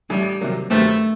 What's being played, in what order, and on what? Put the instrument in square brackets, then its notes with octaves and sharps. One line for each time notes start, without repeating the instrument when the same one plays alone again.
[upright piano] A1 A2 A3 [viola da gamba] G3
[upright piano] C3 D#3 F#3 A#3
[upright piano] G2 D#3 F#3 C4 G4 [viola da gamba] A3